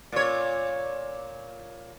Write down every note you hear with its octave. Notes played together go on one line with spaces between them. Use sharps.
A#2 C#5